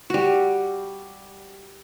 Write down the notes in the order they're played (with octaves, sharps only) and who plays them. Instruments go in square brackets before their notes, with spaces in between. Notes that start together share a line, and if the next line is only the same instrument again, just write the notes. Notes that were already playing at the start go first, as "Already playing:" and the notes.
[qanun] G3 F#4